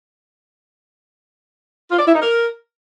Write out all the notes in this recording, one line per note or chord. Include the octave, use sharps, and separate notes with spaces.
F4
D5
E4
D#4
A#4